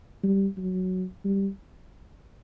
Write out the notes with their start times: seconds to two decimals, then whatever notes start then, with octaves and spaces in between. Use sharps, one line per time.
0.24 G3
0.57 F#3
1.25 G3